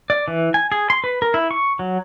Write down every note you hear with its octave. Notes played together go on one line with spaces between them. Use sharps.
D5
E3
G#5
G#4
C6
B4
A#4
E4
C#6
F#3